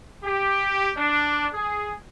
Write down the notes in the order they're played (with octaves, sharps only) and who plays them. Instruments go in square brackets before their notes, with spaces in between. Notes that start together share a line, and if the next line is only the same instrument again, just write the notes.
[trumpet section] G4
D4
G#4